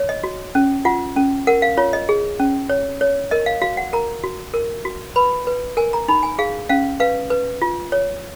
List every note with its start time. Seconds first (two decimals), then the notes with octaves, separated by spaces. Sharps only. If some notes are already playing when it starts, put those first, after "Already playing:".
Already playing: C#5
0.09 D#5
0.24 F#4
0.55 C#4
0.85 F4 F#5
1.17 C#4
1.47 A#4 F#5
1.62 F5
1.77 F4 C#5
1.93 D#5
2.09 G#4
2.40 C#4
2.69 C#5
3.01 C#5
3.31 A#4 D#5
3.46 F5
3.62 F#4 F5
3.77 F#5
3.93 A#4 A#5
4.23 F#4
4.54 A#4
4.85 F#4
5.16 B4 B5
5.47 B4
5.77 A#4 G#5
5.93 A#5
6.08 D#4 B5
6.23 G#5
6.39 G#4 F5
6.69 C#4 F5
7.00 B4 F5
7.30 B4
7.62 F4
7.92 C#5